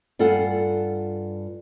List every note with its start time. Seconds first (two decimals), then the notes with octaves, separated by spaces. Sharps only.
0.19 G2 F4 A4 F#5 G#5